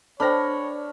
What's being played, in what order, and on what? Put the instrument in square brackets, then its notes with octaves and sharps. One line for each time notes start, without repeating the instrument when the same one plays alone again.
[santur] D4 [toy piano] A4 C5 G5 [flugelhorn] C#5 [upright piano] B5 F6 A#6